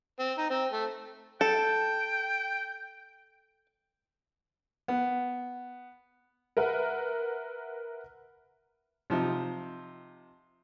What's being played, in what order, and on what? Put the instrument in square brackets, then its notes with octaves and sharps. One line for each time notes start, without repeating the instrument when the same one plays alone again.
[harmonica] C4
D#4
C4
A3
[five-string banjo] A4 [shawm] G5
[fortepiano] B3
[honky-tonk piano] A#4 B4 E5 F#5
[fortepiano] C3 F3 D#4